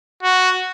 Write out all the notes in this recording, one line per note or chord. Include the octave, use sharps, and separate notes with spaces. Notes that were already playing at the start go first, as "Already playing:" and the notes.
F#4